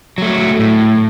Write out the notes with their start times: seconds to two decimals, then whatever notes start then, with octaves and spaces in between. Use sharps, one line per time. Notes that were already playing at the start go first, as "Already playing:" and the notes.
0.18 F#3 A3
0.59 A2